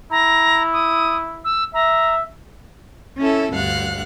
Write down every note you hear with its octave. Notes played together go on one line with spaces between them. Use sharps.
E4 A#5
D#6
E6
E5 A#5
C#4 E4 A4
D2 G2 F5 F#5 F#6